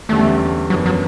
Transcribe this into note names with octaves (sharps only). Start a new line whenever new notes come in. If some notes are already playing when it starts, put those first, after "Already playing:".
E2 D3 G3 A3 C#4
F#2 E3 F#3 B3 D4
F#3